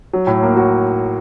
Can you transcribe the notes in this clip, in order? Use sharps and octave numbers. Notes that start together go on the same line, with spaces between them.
F#3
A2
A#3
F#4